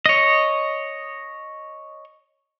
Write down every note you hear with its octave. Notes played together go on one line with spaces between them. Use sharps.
C#5 D#5